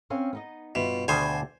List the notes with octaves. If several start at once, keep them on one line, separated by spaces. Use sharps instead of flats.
C4 C#4 F5
B3 D#4 D#5
G2 B2 F4 E5
D2 B2 D3 D4 G4 C5 G#5